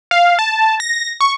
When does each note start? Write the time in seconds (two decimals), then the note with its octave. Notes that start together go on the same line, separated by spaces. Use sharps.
0.11 F5
0.39 A5
0.80 A#6
1.21 C#6